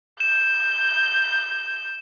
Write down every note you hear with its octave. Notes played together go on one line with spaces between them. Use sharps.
G6 E7